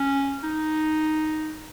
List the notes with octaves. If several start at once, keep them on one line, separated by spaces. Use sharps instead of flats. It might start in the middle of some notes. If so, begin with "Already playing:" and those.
Already playing: C#4
D#4